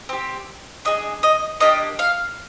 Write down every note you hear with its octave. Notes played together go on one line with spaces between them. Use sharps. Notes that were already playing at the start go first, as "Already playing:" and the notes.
C4 G4
D4 G#4 D#5
D#5
A#3 D4 G4 D#5
F5